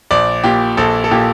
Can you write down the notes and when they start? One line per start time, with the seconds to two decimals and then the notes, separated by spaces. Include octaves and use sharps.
0.11 A#1 D5
0.44 A#2 G4
0.77 A#1 A4
1.04 A4
1.11 A#2 G4